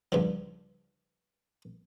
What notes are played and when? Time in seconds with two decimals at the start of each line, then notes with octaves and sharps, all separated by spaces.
0.12 C#2 G2 F3